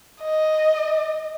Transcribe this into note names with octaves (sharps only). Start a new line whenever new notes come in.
D#5